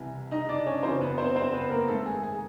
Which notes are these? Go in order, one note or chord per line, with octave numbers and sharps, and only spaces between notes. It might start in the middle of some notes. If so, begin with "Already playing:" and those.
Already playing: C2 C3 E3
D#4 D#5
D4 D5
C#4 C#5
F#2 C#3 E3 C4 C5
B3 B4
C4 C5
C4 C5
B3 B4
A#3 A#4
G#2 D#3 A3 A4
G#4
G#4